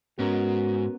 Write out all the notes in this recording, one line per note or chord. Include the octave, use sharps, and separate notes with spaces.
G#2 B3 C#4 F#4 A#4